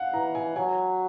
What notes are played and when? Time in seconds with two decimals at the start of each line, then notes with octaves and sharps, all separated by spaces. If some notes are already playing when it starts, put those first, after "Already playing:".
Already playing: F5 F#5
0.13 E3 A#5
0.35 G#5
0.56 F#3 G#5